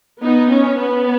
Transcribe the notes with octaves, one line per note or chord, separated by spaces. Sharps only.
B3 D#4
C#4
B3